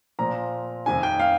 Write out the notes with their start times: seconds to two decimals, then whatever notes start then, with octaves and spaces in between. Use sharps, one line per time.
0.19 A#2 F3 A#5
0.86 F2 C3 D#3 G#5
1.03 G5
1.20 F5